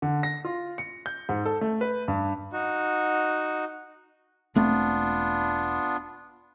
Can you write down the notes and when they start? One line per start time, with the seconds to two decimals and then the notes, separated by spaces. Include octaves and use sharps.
0.02 D3
0.23 A#6
0.45 F4
0.78 C#7
1.06 G6
1.29 G#2
1.45 A4
1.61 A3
1.81 B4
2.08 G2
2.52 D#4 F#4
4.55 E1 A3 B3 C4 D4 F4